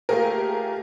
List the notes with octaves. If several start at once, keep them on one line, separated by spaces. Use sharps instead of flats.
A3 A#3 F4 G4 G#4 A#4